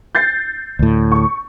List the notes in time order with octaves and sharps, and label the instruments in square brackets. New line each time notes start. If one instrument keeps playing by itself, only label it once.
[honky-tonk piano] G6 A6 C7
[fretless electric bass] D2 A2
[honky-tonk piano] C#6